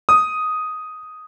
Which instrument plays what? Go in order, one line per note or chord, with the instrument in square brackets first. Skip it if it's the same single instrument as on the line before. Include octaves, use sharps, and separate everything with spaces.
[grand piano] D#6